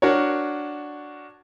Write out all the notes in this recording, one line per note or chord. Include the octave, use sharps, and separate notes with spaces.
D4 F#4 A#4 C#5